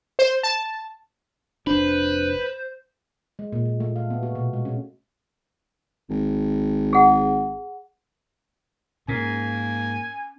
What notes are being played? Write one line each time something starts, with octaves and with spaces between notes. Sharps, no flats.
C5
A5
F1 D4 B4 C5
G#3
A#2
A#2
A3
F5
B3
F#4
B2
G#3
C#4
G#1
G#4 F#5
G#2 A#3 C#4 G#5